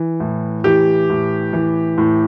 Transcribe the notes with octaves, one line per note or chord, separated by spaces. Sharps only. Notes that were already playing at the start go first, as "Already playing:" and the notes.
Already playing: E3
A2
E3 G4
A2
E3
A2